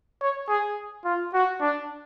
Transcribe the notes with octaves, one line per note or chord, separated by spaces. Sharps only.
C#5
G#4
F4
F#4
D4